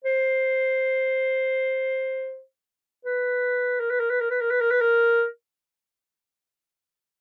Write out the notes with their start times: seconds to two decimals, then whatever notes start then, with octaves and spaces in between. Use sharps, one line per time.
0.04 C5
3.05 B4
3.80 A#4
3.90 B4
4.00 A#4
4.10 B4
4.21 A#4
4.31 B4
4.41 A#4
4.51 B4
4.61 A#4
4.71 B4
4.81 A#4